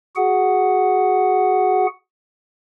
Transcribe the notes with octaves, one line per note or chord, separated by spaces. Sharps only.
F#4 G#4 F#5